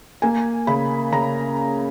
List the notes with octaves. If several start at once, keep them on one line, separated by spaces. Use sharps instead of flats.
A#3 G#5
C#3 B5
C#3 A#5